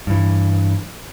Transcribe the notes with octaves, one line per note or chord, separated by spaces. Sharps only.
G2 E3